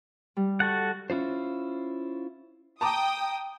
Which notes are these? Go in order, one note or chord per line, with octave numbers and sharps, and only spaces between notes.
G3
F#4 A4 F#5
C#4 E4 F4 C5
G5 A5 A#5 D6 D#6